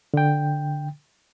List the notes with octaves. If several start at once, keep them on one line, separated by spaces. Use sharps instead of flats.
D3 G5